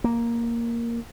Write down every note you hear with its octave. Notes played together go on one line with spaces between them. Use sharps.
A#3